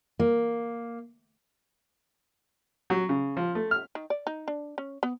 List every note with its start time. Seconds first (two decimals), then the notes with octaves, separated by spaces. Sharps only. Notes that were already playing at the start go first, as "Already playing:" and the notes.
0.19 A#3
2.90 F#3
3.09 C#3
3.37 F3
3.55 A3
3.71 F6
3.95 D#3
4.10 D5
4.27 D#4
4.48 D4
4.78 C#4
5.03 B3